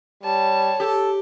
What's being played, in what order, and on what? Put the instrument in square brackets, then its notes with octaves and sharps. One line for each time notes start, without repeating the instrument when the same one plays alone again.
[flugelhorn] G3 [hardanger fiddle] C#5 A5
[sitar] G4 [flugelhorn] A4